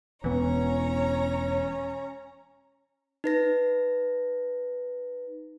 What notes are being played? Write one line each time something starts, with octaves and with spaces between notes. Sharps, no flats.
E1 E3 B3 C#4 C#5 A#5
D#4 B4 A#6